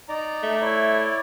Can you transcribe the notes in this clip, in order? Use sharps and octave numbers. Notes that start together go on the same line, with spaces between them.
D#4 D5 A#5
A3
E4 C#5 D5